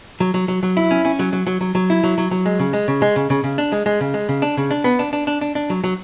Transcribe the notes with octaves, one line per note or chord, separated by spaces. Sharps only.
F#3
F#3
F#3
F#3
E4
C#4
C#4
F#3
F#3
F#3
F#3
F#3
E4
F#3
F#3
F#3
G#3
C#3
G#3
C#3
G#3
C#3
C#3
C#3
D4
G#3
G#3
C#3
G#3
C#3
D4
C#3
D4
B3
D4
D4
D4
D4
D4
F#3
F#3